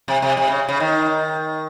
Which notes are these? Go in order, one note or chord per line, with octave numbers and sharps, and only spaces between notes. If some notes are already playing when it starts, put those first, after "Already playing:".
C3
C3
C3
C#3
C#3
D#3